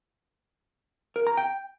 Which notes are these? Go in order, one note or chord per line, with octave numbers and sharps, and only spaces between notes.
A#4
A#5
G5